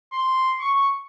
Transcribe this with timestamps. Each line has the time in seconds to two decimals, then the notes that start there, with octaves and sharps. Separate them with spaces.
0.13 C6
0.59 C#6